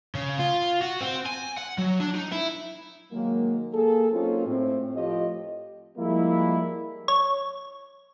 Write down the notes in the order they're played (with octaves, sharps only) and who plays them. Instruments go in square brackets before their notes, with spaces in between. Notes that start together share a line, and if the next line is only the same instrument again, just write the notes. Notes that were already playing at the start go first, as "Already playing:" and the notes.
[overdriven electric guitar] C#3
F4
F#4
C4
G#5
F#5
F#3
D4
D#4
E4
[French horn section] D#3 F#3 G#3 A#3
A#3 G#4 A4
F#3 A#3 C4 C#4 D#4 F4
A2 C4
A2 F3 A3 F4 G4 D#5
[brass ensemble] F3 G3 G#3 A#3 E4
[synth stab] C#5